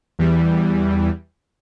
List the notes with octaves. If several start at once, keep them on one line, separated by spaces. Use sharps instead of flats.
E2 E3 G3